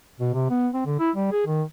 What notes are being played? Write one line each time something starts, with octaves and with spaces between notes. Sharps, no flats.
B2
C3
B3
C4
D3
E4
G3
G#4
D#3